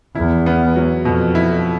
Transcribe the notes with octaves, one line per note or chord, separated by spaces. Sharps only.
E2 E4
B3
F#3
F2 B2
E4